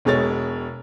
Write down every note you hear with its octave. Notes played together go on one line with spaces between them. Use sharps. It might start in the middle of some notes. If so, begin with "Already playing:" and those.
E1 B2 G#3 C#5 A6